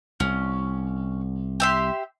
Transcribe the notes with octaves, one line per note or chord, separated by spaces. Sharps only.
C2 C#4
G4 E5 C6